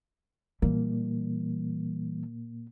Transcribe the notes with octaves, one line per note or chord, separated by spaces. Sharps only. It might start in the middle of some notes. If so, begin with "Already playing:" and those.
A#2 E3 G3 A#3